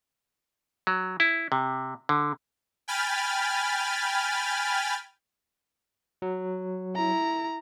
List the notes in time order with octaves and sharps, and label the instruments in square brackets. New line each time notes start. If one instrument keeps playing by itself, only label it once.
[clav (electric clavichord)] F#3
E4
C3
D3
[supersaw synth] G5 G#5 B5 F6 A6
[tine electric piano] F#3
[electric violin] E4 A#5